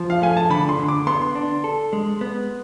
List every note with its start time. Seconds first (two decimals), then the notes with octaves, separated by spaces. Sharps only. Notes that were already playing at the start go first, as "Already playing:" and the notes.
Already playing: F3
0.10 F5
0.22 A3 G#5
0.37 A5
0.50 D3 B5
0.69 C6
0.79 D3
0.88 D6
1.07 B3 C6
1.35 D4
1.64 A4
1.93 G#3
2.21 B3